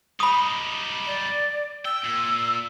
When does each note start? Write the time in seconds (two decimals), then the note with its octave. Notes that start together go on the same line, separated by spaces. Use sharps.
0.20 G3 D#4 B5 D#6
1.07 D5
1.85 G5 E6
2.04 A#2